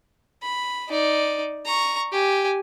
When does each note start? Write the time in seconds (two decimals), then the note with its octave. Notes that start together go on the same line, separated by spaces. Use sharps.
0.42 B5
0.90 D#4 D5
1.65 A#5 C#6
2.12 G4 G#5